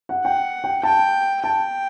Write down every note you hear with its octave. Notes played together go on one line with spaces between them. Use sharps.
F#5
F#5 G5
G5
G5 A5
G5 A5